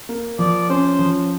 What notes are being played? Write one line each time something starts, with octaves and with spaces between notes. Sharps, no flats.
A#3
F3 D5
C#4 C5
F3